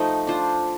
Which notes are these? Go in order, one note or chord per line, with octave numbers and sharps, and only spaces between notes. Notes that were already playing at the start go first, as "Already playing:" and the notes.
Already playing: F3 A3 D#4
D4 F4 C5